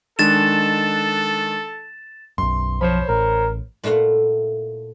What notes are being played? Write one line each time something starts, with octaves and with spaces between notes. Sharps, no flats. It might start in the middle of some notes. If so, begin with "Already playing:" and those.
D#3 G#3 D4 A4 A6 E7
B1 F#2 C6
F3 C5 C#5 B5
A1 A#4
A#2 A3 E4 F5 F#5